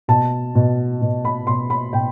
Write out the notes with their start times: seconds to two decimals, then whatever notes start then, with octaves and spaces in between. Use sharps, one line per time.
0.08 B2 A5
0.55 B2
1.02 B2
1.25 B5
1.47 B2 C6
1.70 B5
1.93 B2 G5